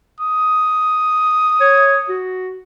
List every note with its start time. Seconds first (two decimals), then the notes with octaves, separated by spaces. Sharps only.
0.20 D#6
1.61 C#5
2.09 F#4